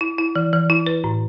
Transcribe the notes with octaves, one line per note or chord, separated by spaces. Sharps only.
E4
E4
E3
E3
E4
B4
A2